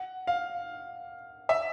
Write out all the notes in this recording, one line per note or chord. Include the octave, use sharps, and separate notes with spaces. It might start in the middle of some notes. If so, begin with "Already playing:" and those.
Already playing: F#5
F5
E5